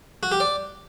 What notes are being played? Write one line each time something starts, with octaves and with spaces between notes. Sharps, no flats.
F#4
G4
D5